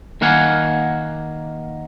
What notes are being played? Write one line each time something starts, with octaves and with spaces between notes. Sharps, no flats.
D#3 A#3 F5 F#5 G#5